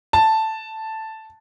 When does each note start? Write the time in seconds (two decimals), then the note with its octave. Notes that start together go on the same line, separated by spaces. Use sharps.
0.13 A5